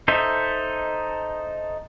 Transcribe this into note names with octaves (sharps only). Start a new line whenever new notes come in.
D#4 A4 C5 D#5 E5